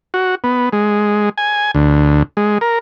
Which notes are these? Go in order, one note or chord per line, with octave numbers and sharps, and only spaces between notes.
F#4
B3
G#3
G#5
D2
G#3
A#4